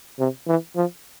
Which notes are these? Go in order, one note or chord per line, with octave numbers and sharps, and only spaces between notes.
C3
E3
F3